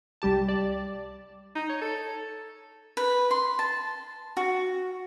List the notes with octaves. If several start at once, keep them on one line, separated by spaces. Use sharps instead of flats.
C2 G3 G4 A5
D5
D#4
C#5
A4
B4
C6
A5
F#4